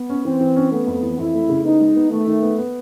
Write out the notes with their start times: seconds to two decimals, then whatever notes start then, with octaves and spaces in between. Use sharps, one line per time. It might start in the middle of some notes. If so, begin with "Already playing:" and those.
Already playing: B3
0.10 C#4
0.25 E3 C4
0.41 E3
0.56 C#4
0.71 A3 B3
0.87 F2
1.03 E3
1.18 F2 E4
1.34 A3
1.49 C#3
1.64 B3 D#4
1.81 G#3
1.96 B3
2.11 D#3 A3
2.27 D#3
2.43 B3
2.58 B3